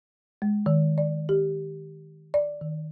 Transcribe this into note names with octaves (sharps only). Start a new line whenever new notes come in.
G#3
D#3
D5
G4
D5
D#3